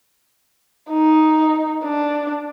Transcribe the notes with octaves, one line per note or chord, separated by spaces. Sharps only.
D#4
D4